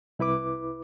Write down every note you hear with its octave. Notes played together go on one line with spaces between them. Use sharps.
C2 E4 B4 D6